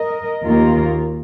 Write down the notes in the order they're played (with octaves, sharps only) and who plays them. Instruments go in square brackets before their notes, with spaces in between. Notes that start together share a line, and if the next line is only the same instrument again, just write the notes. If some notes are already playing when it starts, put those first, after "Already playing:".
Already playing: [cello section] A#4 D#5
D#2 D#3 A#3 F4 A#4